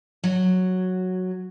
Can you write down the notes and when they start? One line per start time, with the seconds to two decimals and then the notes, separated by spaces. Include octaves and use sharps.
0.24 F#3